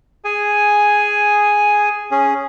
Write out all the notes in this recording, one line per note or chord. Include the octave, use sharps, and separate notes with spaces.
G#4 G#5
C#4 G#4